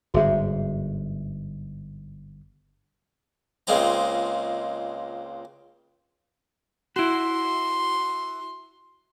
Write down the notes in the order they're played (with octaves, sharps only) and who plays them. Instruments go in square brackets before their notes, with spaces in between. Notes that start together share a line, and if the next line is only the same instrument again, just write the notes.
[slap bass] G1 G#2 [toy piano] F#4 G#4 E5
[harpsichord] C#2 A#2 G#3 C4 A#5
[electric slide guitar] E4 F#4 [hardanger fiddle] C6